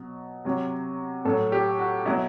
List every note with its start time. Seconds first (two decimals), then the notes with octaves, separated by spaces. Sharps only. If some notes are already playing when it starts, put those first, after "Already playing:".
Already playing: B2 F#3
0.45 C3 F#3
1.25 A2 F#3 A4
1.52 G4
1.79 F#4
2.05 B2 F#3 E4